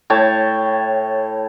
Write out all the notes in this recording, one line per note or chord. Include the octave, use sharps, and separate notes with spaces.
A2 C#5 G5 A5